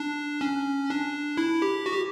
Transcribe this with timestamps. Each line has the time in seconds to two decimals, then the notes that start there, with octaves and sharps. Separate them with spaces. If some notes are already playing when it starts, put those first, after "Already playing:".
Already playing: D4
0.41 C#4
0.90 D4
1.37 E4
1.62 G4
1.86 F#4
1.94 G4